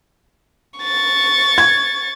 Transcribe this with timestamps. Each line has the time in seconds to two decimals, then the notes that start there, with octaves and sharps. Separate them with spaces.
0.79 C#6 A6
1.58 G#6